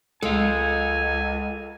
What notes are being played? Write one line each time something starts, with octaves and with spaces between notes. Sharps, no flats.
C#2 G#3 A4 F5 G#5